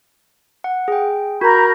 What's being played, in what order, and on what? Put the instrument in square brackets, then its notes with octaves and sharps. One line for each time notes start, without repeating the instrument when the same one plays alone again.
[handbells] F#5
G#4 G5
[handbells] F#4 A#5 [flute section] A#4 B5 G6